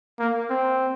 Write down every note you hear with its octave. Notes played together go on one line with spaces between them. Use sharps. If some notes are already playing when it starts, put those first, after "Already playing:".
A#3
C4